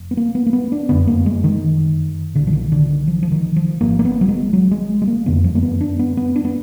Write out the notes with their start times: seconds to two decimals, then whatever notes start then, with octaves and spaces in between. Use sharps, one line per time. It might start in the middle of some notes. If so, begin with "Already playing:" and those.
Already playing: F1 F2
0.11 B3
0.17 A#3
0.35 B3
0.46 A#3
0.53 B3
0.72 D4
0.89 F#1 F2 D3 B3
1.07 A#3
1.26 G#3
1.44 D#3
2.35 B1 A#2 D3
2.47 F3
2.53 D#3
2.72 D3
2.89 D#3
3.08 F3
3.23 F3
3.32 D#3
3.56 F3
3.80 G#1 G#2 A#3
3.99 A#3
4.05 B3
4.21 F#3
4.28 G#3
4.53 F#3
4.71 G#3
5.02 G#3
5.07 A#3
5.26 F#1 F2 D3 B3
5.44 F3
5.55 A#3
5.63 B3
5.81 D4
5.99 B3
6.17 B3
6.36 D4
6.45 B3